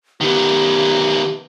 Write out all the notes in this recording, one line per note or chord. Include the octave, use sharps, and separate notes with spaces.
D#3 B3 G4